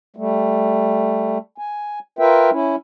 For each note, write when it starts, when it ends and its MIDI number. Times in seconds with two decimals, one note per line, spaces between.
0.16 1.38 55
0.16 1.38 57
1.58 1.99 80
2.19 2.50 65
2.19 2.50 70
2.19 2.50 71
2.19 2.50 76
2.19 2.50 79
2.51 2.76 61
2.51 2.76 64